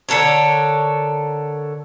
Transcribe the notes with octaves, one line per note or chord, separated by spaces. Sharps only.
D3 A4 A#4 C#5